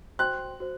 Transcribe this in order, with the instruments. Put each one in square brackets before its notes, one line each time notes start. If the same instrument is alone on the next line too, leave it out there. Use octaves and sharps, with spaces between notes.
[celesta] F#4 C5 G5 C6 [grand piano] F#6
[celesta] F#4 C5